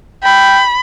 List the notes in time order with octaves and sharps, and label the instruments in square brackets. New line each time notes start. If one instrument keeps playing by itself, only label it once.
[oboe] G5 [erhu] B5